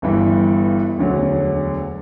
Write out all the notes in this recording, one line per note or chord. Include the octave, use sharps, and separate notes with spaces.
G1 G2 E3
E1 D2 D3 F#3